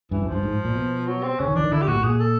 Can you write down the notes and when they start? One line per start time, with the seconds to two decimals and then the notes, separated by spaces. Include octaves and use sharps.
0.11 G2 E3
0.22 F#2
0.28 G2 F3
0.43 G#2
0.65 A#2
0.76 B2
1.07 F#3
1.23 C4
1.40 C#3 C#4
1.48 D#3
1.55 E3 D4
1.64 D#3
1.72 D3 E4
1.82 G4
1.88 A#2 F#4
1.96 A2
2.04 A#2 G#4
2.20 A4